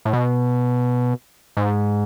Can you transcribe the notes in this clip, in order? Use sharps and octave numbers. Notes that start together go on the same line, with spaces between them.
A2
B2
G#2